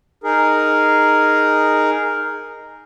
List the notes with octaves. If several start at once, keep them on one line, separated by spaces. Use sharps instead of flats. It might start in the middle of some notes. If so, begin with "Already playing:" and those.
D#4 G#4 A#4